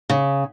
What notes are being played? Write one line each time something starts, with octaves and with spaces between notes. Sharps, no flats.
C#3